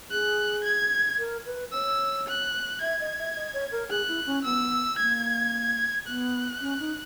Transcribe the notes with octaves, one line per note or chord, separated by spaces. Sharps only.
G#4 F#6
G#6
A#4
B4
C#5 E6
F#6
E5 G#6
D#5
E5
D#5
C#5
A#4
G#4 F#6
E4
C#4
B3 E6
A#3 G#6
B3 F#6
C#4
D#4